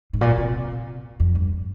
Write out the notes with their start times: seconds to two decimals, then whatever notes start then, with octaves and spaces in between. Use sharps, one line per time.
0.13 G#2
0.21 A#2
0.38 C3
1.20 F2
1.35 G2